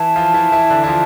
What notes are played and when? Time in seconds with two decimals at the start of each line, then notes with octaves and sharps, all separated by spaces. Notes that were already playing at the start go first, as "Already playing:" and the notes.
Already playing: E3 E4 A5
0.16 F3 F4
0.34 E3 E4
0.52 E3 E4
0.70 D3 D4
0.84 E4
0.87 F3 F4